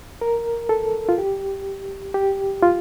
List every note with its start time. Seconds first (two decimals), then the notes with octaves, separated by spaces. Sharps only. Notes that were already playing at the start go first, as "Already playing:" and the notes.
0.21 A#4
0.69 A4
1.09 F4
1.18 G4
2.14 G4
2.63 F4